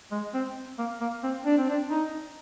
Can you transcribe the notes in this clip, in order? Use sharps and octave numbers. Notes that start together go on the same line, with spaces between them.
G#3
C4
A#3
A#3
C4
D4
C4
D4
D#4